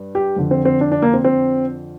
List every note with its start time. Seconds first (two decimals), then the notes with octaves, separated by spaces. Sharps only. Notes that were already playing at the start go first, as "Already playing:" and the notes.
Already playing: G2
0.15 G4
0.36 F2 D3
0.51 C4
0.65 C4
0.81 D4
0.92 D4
1.02 A#3
1.13 C4
1.24 C4